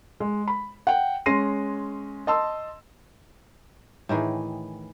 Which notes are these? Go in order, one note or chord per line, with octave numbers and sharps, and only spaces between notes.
G#3
B5
F#5 G5
G#3 C#4 C6 A#6 C7 D#7
D#5 A5 C6 E6
A2 D#3 E3 G#4